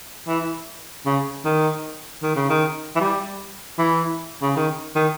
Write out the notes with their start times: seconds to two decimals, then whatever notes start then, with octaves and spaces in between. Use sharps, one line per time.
0.28 E3
1.06 C#3
1.45 D#3
2.23 D#3
2.36 C#3
2.49 D#3
2.96 E3
3.00 G3
3.78 E3
4.42 C#3
4.56 D#3
4.95 D#3